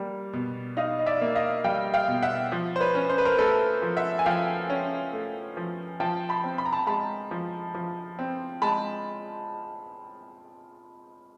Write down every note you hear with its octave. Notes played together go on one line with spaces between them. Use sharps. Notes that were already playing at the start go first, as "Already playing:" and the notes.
Already playing: G3 A#3
B2
D#4 D#5 F5
D#5
D5 E5
A#3
D#5 F5
G3 F5 G5
F5 G5
B2
E5 F#5
F3
C5
B4 C#5
C#4
C5
B4
A#4 C5
A3 A4 B4
F3
E5 F#5
G#5
F3 F5 G5
C#4
A3
F3
F3 G5 A5
A5 B5
C4
B5
A#5
A5 B5
G#3 A5 B5
F3
F3
C4
G#3 A5 B5